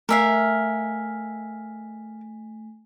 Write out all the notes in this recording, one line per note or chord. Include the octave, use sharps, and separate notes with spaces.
A3 A#4 E5 F5 G#5 B6